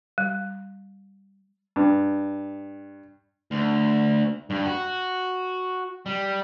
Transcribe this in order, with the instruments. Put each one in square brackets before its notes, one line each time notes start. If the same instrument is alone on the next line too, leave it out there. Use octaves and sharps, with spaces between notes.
[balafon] G3
[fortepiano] G2
[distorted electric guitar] D2
G2
F#4
G3